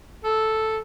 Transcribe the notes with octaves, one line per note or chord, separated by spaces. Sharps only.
A4